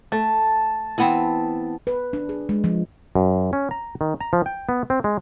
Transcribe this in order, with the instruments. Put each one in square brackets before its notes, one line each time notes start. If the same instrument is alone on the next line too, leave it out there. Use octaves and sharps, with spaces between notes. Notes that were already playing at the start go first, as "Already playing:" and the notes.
[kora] A3 [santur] A5
[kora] E3 B3 C4
[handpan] B4
D4
G#4
G#3
F3
[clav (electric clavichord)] F#2
C#4
A#5
D#3
A#5
F3
G5
B3
C4
G#3